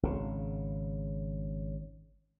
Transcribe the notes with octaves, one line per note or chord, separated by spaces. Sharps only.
G#1 C#3